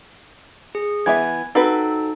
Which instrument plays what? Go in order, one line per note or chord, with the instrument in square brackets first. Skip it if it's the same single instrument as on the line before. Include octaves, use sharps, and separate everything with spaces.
[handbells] G#4
[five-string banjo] E3 B3 E5 [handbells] G#6
[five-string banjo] C4 F#4 B4 [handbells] D#4 A4